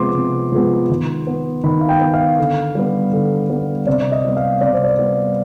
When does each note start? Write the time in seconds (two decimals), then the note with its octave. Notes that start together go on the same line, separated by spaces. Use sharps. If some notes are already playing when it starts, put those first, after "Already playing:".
Already playing: C3 F3 G#3 B3 C6 D6
0.14 C3
0.52 F3 G#3 B3
0.90 D#3
1.27 B3
1.64 D#3 B5
1.81 F5
1.89 G5
2.01 B3
2.14 F5
2.38 D3
2.75 G3 B3
3.13 D3
3.50 G3 B3
3.87 C3 D5
4.12 D#5
4.25 G3 B3
4.37 F5
4.61 C3 D5
4.73 C5
4.83 D5
4.99 G3 B3